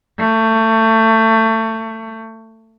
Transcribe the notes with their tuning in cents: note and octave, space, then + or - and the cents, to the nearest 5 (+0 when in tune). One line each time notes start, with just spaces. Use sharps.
A3 +25